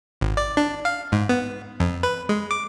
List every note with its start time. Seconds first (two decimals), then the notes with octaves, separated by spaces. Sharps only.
0.21 G#1
0.37 D5
0.57 D4
0.85 F5
1.12 G#2
1.29 B3
1.80 F2
2.03 B4
2.29 G#3
2.51 D6